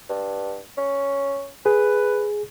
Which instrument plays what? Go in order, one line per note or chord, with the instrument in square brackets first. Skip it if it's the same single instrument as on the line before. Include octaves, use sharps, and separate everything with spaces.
[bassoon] G2
C#4
[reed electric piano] G#4 [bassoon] B4